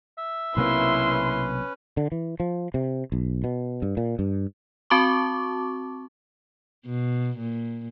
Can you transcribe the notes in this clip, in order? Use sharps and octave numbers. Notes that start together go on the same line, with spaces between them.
E5
B1 C3 A#3 C#4 E4 B4 C6
D3
E3
F3
C3
B1
B2
G2
A#2
G2
C4 F#4 A5 C#6 D6
B2
A#2